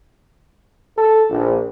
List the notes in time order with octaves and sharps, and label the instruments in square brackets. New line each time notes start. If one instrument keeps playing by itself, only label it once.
[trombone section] A4
A#1